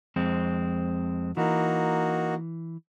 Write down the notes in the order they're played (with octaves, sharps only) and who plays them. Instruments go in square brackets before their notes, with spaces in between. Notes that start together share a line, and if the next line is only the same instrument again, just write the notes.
[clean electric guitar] F2 G#3 C4
[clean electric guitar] E3 [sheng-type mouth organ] A#3 D#4 F#4